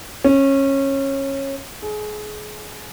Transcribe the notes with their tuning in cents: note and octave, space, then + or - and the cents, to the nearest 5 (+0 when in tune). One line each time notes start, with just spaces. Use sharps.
C#4 -20
G#4 +30